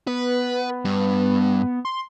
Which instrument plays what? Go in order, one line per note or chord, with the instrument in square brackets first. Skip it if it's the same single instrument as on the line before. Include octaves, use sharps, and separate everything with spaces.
[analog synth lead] B3 [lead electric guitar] B4
[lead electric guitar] G2
[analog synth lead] C6